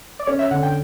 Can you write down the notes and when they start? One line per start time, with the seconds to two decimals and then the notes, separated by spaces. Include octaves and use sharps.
0.19 D5
0.27 C#4 C#5
0.39 E5
0.51 D3 F#5
0.63 G5